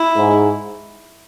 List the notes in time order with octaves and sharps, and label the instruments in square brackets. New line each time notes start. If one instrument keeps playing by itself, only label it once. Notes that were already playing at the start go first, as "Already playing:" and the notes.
Already playing: [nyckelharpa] E4
[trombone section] G#2